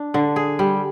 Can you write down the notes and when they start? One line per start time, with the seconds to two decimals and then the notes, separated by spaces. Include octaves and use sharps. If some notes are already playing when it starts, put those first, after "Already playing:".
Already playing: D4
0.14 D3
0.36 G#4
0.59 G3